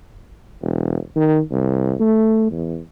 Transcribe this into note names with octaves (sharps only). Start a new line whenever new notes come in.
E1
D#3
C2
A3
E2